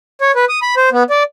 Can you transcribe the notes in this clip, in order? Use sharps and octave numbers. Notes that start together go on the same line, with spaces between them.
C#5
B4
D#6
B5
C5
B3
D5